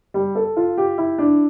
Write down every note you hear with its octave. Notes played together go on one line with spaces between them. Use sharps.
G3
A4
F4
G4
E4
D4